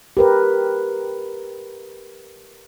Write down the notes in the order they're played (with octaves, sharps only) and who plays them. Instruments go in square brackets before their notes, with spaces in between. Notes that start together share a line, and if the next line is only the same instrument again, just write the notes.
[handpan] G4 A#4 B4